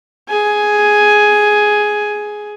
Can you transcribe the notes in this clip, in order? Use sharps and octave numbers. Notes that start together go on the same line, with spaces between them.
G#4 G#5